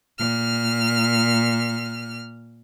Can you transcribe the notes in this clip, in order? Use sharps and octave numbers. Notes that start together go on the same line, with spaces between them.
A#2 F6